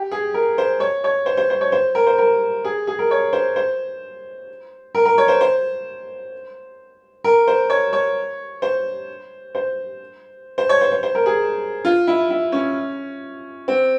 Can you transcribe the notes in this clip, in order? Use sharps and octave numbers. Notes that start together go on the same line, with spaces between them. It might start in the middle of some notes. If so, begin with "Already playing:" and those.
Already playing: G4
G#4
A#4
C5
C#5
C#5
C5
C5
C5
C#5
C5
A#4
C5
A#4
G#4
G#4
A#4
C#5
C5
C5
A#4
A#4
C#5
C5
C5
A#4
C5
C#5
C#5
C5
C5
C5
C#5
C5
C5
C5
A#4
G#4
F4
E4
E4
C#4
C4